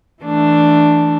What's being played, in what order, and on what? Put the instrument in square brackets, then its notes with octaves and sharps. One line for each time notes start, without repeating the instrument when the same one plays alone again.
[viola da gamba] E3 A3 D4